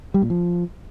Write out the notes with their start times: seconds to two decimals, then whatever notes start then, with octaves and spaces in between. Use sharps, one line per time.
0.14 G3
0.22 A#2
0.30 F3